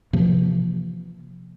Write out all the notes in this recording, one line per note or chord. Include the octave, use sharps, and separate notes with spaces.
C3 E3 F3 A#3